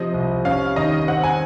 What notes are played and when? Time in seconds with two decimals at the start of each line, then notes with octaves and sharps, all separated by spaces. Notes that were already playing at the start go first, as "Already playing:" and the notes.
Already playing: C3 F3 D#5
0.14 C2
0.45 C#4 F5
0.76 D#3 D#5
1.08 C4 F#5
1.23 G#5